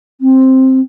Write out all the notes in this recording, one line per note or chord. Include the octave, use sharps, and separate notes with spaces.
C4